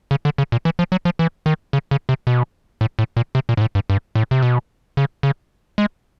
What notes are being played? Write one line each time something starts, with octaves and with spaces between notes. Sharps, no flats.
C#3
D3
C#3
A#2
E3
F3
F#3
F3
E3
D#3
C#3
C#3
C3
B2
A2
A2
A#2
C3
A#2
G#2
A2
G2
G2
A2
C3
B2
C#3
C#3
G#3